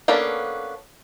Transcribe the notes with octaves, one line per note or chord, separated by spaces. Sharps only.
A#3 B3 C#4 D4 A4